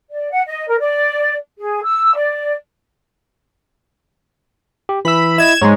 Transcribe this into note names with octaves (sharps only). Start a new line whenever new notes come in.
D5
F#5
D#5
A#4
D5
G#4
E6
D5
G4
E3 E4 B5 E6
E4 D#5 G#6 E7
G#2 G#3 C#5 A#5